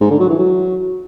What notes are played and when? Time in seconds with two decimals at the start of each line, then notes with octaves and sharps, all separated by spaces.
0.01 G#2
0.10 D3
0.20 F#3
0.29 E3
0.39 F#3